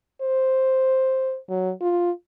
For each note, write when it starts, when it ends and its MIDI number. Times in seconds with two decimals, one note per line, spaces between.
0.22 1.37 72
1.49 1.71 54
1.81 2.11 65